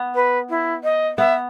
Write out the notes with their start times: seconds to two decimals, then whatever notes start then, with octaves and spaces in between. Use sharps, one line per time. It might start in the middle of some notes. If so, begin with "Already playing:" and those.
Already playing: B3
0.15 B4
0.49 E4
0.84 D#5
1.18 B3 E5